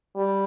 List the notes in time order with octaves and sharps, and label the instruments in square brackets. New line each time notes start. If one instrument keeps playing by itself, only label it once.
[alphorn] G3